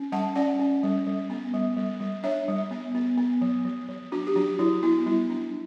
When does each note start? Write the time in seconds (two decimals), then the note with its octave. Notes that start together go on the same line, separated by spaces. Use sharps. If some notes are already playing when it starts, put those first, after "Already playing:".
Already playing: C#4
0.12 G3 F#5 A5
0.35 C#4 D5 F#5
0.59 C#4
0.83 G3
1.07 G3
1.30 B3
1.54 G3
1.77 G3
2.00 G3
2.23 D4 C#5 E5
2.48 G3
2.71 B3
2.95 B3
3.18 B3
3.41 F#3
3.65 F#3
3.88 F#3
4.12 D4 F#4
4.27 G4
4.36 F#3 D4 F#4
4.59 F#3 E4
4.83 B3 E4
5.06 G3 E4
5.30 D4